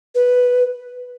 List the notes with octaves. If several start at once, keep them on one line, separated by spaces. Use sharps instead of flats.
B4